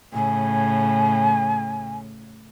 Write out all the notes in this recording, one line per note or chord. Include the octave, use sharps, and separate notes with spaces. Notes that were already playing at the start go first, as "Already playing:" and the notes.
A2 C#3 G#5